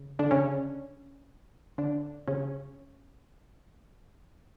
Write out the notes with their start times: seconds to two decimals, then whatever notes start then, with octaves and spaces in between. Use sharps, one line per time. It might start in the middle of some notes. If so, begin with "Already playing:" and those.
Already playing: C#3
0.19 D3 D4
0.31 C#3 C#4
1.78 D3 D4
2.28 C#3 C#4